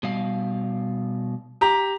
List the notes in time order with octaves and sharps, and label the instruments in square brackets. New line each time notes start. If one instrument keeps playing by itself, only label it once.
[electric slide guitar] B2 G3 F5
[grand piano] G4 A#5